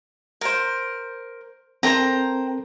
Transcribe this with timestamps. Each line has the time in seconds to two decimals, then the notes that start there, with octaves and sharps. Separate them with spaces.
0.41 A#4 C5
1.83 C4 A4 A#4 C5 G5 A#5